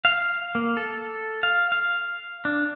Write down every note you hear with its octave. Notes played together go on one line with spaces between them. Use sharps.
F5
A#3
A4
F5
F5
D4